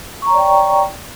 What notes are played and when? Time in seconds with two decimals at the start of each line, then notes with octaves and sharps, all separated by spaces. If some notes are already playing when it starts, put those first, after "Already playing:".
0.22 C#6
0.26 A#5
0.30 C#5
0.34 D5
0.38 G5